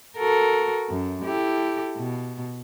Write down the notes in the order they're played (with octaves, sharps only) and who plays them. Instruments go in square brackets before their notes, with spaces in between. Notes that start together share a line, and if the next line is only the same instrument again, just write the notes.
[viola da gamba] F#4 A4 A#4
F#2
E4 G4 A4
B2